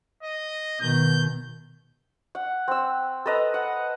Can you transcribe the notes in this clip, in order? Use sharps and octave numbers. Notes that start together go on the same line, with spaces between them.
D#5
B2 D#3 G6
F#5
C4 E6
A4 B4 D#5 A#5
F#5